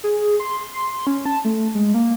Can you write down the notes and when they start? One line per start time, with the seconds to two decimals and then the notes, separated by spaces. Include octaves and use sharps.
0.04 G#4
0.40 C6
0.74 C6
1.07 C#4
1.26 A5
1.45 A3
1.75 G#3
1.94 A#3